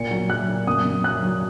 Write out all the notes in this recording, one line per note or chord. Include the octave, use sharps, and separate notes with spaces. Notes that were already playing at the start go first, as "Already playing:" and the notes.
Already playing: A#2 C#7
F#3
F#3 F#6
A#2
F#2 D#6
F#2
F#3 F#6
F#3